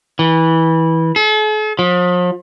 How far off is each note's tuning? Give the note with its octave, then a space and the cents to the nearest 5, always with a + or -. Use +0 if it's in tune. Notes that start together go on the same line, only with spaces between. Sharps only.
E3 -20
A4 -45
F3 +40